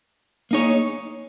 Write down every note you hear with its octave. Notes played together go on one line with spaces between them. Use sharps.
A#3 D#4 G#4 C#5